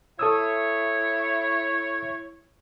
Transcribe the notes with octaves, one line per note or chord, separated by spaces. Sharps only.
E4 A4 C#5 D#6 E6